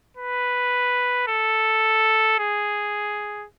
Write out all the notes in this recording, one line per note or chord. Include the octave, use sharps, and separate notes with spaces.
B4
A4
G#4